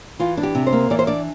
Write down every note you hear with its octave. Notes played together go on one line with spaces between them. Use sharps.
E3 F4
D4
G4
C3
C5
A#3
E3 D5
C5
D4 D5